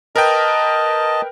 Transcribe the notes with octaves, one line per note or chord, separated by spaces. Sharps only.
A#4 B4 D#5 G5 A5